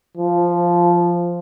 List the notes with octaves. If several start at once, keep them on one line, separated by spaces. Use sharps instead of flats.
F3